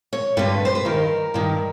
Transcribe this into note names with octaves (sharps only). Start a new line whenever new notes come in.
C#5
G2 D3 B4
C5
B4
G2 D#3 A#4
G2 D#3